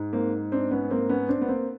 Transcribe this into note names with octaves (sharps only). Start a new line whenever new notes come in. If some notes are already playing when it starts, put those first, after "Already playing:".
Already playing: G#2
A#3 C4
C4 D4
B3 C#4
A#3 C4
B3 C#4
C4 D4
B3
A#3 C4